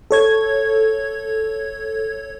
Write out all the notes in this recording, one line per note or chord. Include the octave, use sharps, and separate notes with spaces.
A4 C#5 G#6